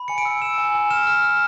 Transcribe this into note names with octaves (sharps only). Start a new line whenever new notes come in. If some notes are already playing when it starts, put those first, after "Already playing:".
Already playing: B5
G#5 C#7
D7
E6
E6 E7
G#5
G#5
F6 E7
F6
F6